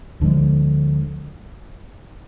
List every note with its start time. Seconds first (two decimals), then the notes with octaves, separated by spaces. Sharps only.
0.20 D2 D3 F3 G#3